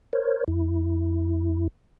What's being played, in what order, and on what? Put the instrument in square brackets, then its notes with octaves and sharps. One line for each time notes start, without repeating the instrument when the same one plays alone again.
[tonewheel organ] A#4 C5 C#5
F2 E4